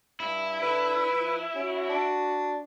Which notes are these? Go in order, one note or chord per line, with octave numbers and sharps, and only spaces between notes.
G2 E4
D3 B4
F3
C#4 F#4
D4